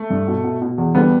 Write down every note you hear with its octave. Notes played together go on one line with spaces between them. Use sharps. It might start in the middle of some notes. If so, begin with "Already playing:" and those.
Already playing: A3
G2
B2
B2
B2
E2
D3 G3 B3